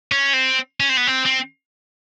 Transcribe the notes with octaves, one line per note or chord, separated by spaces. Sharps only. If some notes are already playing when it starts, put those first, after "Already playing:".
C#4
C4
C#4
C4
B3
C4
C4